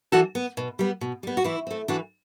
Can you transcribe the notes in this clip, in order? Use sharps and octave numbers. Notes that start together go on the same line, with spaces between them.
E3 F#4 A4
B3
B2
G3 B3
B2
G3 B3
F#4
E3 E4
A3 C4
E3 D4 F#4